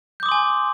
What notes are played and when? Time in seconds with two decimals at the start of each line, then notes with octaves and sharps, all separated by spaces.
0.20 G6
0.23 D6
0.26 D#6
0.29 C6
0.32 G#5